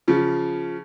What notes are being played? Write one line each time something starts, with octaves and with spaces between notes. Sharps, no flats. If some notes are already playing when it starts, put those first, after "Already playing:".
C#3 F3